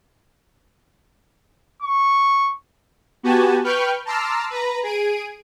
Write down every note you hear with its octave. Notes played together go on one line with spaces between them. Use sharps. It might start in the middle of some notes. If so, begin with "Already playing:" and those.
C#6
B3 F#4 G4 G#5 A5
B4 G5 C#6 F6 G6
A5 A#5 C6 D6 E6 F6
B4 A#5
G#4 D7 D#7